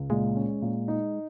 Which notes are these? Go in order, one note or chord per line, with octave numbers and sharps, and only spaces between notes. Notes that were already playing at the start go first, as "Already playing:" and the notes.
Already playing: C#2
A#2 G#3
C#4
A#2
D#4